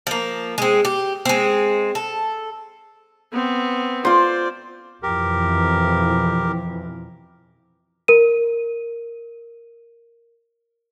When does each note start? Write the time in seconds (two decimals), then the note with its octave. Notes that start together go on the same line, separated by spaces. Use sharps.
0.07 F3 A#3
0.58 G#3 C4
0.85 G4
1.25 G#3 C4
1.95 A4
3.32 B3 C4
4.05 F4 C5 D5
5.03 F2 B2 E3 G4 A#4
8.08 A#4 D#7